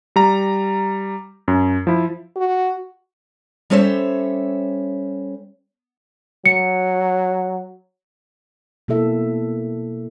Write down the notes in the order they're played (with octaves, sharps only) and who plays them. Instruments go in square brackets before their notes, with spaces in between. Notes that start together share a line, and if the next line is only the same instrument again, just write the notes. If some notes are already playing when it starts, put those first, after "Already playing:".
[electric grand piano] G3 A#5
F#2
F3 E4
[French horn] F#4
[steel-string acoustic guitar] G3 C#4 A4 C5 C#5 E5
[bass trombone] F#3 [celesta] C#7
[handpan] B2 A#3 E4 A4 E5